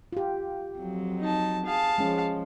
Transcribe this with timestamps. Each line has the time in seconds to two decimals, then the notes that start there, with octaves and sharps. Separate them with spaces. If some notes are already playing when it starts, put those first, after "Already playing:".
0.12 F4 G4
0.78 F2 F#3
1.20 D#4 A5
1.66 G#4 F5 A5
1.98 F3 G#3 C#4